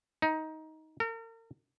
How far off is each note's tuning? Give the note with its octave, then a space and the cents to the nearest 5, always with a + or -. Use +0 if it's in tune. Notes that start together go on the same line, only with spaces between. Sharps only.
D#4 +15
A#4 -40